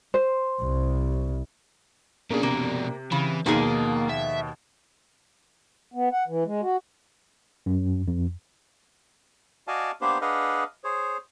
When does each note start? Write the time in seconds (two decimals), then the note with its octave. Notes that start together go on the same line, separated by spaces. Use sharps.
0.14 C5
0.62 C2
2.30 B2 A#3 C#4 D4 G#4
2.43 C3 A#3
3.12 C#3 E3
3.46 D#2 B2 F3 A#3 D#4 G#4
4.09 E5
5.94 B3
6.12 F#5
6.28 E3
6.45 G#3
6.62 F#4
7.66 F#2
8.08 F2
9.68 F#4 D5 D#5 F5 G#5 A5
10.01 A#3 B3 D4 G4 C5
10.21 D4 G#4 B4 D#5 F5 F#5
10.84 G#4 C5 C#5